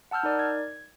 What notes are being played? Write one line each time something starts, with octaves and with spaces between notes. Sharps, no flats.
F#5 A5 E6 F6 G6
D#4 A#4 D5
G#6